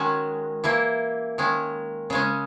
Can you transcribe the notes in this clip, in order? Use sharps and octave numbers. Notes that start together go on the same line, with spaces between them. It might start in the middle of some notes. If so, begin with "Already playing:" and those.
Already playing: D#3 G#3 C#4 F#4
E3 A#3 E4
D#3 G#3 C#4
C#3 G#3 C#4